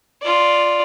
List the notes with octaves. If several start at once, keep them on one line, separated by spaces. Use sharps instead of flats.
F4 D5